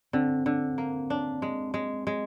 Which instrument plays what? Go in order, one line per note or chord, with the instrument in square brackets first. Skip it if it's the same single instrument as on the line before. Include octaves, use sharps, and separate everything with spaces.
[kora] D3 [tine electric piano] C4
[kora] D3
A#3
D4
G#3
G#3
G#3